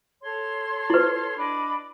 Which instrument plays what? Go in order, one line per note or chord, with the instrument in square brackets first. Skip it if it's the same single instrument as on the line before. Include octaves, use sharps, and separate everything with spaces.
[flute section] A4 C#5 C6
[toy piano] E4 B4
[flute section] D4 D#5 B5